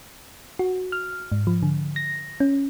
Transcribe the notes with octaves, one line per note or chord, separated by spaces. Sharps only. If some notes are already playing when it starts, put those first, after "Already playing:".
F#4
F6
G#2
F3
D3
A#6
C#4